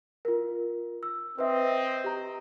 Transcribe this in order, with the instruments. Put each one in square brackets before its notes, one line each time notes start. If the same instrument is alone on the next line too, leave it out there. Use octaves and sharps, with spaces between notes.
[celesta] F4 A#4
E6
[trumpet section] C4 D#5 [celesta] B4 E5
[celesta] G4 A#5